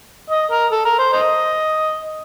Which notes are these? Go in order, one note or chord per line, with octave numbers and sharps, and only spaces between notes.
D#5
A#4
A4
A#4
C5
C5 D#5